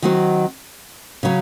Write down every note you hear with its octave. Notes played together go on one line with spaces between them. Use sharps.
D#3 F#3 C4 F#4
C#3 F#3 C#4